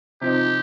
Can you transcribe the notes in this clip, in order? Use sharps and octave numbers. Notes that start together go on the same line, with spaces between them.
C3 F3 C4 D#4 G4